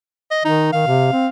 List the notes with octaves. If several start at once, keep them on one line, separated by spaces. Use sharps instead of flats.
D#5
D#3 D#4
D#3 F5
C3
C4